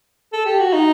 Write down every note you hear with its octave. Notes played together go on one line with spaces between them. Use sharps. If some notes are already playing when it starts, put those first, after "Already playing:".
A4
G4
F#4
D#4